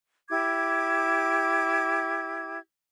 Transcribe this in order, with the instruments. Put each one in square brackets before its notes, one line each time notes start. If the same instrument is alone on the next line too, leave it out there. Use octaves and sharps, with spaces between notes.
[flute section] E4 G4 D6 G#6